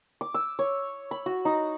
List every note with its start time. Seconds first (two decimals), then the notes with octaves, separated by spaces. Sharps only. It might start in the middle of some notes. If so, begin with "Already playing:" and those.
0.21 D6
0.34 E6
0.59 C#5
1.11 B5
1.26 F#4
1.45 D#4